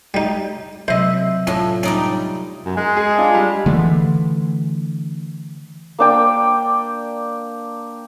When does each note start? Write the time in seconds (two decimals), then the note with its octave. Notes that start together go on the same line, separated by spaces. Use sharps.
0.14 G3 D#4
0.88 C3 F#3 C5 D#5 E5
1.47 A2 C#4 F4
1.83 G3 C#4 D#4 D5
2.65 F#2
2.77 G#3
2.97 G#4
3.18 D4 F4
3.34 G3
3.66 D3 E3 A3
5.99 A#3 D4 G5